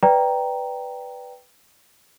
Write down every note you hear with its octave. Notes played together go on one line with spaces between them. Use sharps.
B4 D5 G5 A#5